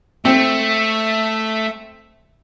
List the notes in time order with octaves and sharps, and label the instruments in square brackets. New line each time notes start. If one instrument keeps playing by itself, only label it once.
[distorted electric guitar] A3 [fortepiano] C4 [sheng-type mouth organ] E5